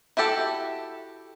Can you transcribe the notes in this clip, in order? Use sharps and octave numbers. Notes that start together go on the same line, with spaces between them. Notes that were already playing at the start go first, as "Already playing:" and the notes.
E4 F#4 G4 A4